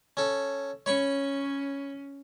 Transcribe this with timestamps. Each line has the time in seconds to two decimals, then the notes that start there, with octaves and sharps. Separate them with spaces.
0.17 C#4 A4
0.86 C#4 C#5 B5 C#6